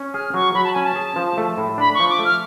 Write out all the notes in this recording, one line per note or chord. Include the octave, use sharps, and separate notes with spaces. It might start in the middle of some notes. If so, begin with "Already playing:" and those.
Already playing: C#4
G#4 F6
F#3 C#6
F#3 B5
A5
C#4 G#5
A5
G#4
F3
A3
A2
D4 B5
C#6
F3
D6
A3
F6